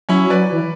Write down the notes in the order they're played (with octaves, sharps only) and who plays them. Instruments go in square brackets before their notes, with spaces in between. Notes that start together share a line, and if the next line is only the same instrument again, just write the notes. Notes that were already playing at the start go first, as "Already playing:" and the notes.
[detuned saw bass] F#3 [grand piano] C#4 E4
[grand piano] B4 D5
[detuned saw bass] E3